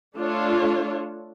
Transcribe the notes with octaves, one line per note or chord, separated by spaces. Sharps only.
A3 D4 F4 A4 C#5